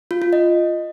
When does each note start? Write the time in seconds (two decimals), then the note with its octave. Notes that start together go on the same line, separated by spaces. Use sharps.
0.11 F4
0.22 F4
0.33 D#5